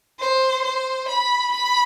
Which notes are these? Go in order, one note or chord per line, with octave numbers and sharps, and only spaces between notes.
C5
C5
B5
B5